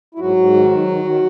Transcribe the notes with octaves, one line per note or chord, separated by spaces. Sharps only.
E4
G#2 F#3 F#4
G#2
D#3
F#3
D#3
D#3